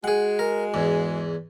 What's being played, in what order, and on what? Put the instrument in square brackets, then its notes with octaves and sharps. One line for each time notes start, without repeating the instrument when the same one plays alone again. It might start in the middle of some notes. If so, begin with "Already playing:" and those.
[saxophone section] G#3 F#4 [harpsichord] G#4 F#5
[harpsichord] A#4
E2 G#2